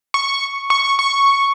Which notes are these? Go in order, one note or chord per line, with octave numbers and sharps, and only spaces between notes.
C#6
C#6
C#6